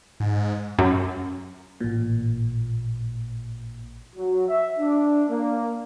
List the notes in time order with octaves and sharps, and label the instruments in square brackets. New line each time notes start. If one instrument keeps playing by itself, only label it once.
[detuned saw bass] G#2
[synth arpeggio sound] F#2
[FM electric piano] A1 A#2
[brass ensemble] F#3
E5
D4
A#3